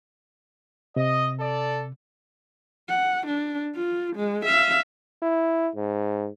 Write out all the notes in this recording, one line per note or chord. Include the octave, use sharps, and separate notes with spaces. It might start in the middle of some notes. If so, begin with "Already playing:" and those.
C3 D#5
A4 D5
F#5
D4
F4
G#3
E5 F5
E4
G#2